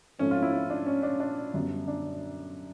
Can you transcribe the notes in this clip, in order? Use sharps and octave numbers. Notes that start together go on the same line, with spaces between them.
G#2 F3 A3 C4 C#4
F4
E4
E4
D4
C#4
D4
D4
F#2 D3 G3 B3
D4